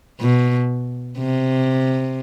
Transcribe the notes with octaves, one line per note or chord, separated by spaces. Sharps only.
B2
C3